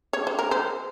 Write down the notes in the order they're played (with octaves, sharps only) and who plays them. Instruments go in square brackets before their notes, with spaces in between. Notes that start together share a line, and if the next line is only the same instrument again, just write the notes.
[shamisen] C#5
C5
A#4
C5